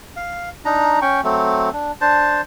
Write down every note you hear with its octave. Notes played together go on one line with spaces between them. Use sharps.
F5
D4 D#4 A#5
C#4 G5 C#6
F#3 A3 C4
D4
D4 C5 A5